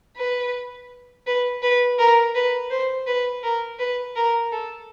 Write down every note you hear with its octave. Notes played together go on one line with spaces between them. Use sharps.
B4
B4
B4
A#4
B4
C5
B4
A#4
B4
A#4
A4